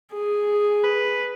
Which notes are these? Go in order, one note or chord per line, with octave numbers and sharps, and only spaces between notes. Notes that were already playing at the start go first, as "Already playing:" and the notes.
G#4
B4